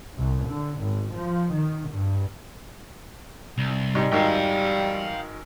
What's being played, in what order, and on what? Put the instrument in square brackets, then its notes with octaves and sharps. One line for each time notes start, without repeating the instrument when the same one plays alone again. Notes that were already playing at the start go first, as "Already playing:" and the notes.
[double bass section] C2
D3
G#1
F3
D#3
G2
[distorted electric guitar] C2
[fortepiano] G#2 [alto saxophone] G3
[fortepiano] G#1 G#2 D#3 [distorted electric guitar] F5 G5